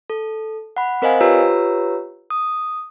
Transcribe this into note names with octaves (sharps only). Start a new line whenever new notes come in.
A4
F#5 B5
C4 A#4 C5 D#5 F5 G#5
F4 G4 B4 C#5 A#5 E6
D#6